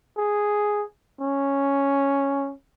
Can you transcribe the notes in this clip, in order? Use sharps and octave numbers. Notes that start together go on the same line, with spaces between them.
G#4
C#4